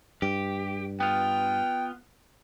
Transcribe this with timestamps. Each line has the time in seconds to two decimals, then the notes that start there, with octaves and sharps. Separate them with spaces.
0.22 G2 G4
1.00 B3 F4 G5